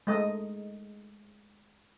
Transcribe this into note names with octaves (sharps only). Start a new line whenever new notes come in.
G#3 A3 D#5